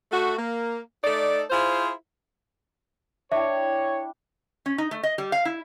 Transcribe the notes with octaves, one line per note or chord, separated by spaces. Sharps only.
A3 F#4
A#3
A3 D#4 A4 D5
E4 F4 G#4 C5
D4 E4 C#5 E5 G5
C#4
D#4
A3
D#5
G3
F5
E4